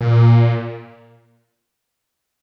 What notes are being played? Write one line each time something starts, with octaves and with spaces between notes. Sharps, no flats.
A#2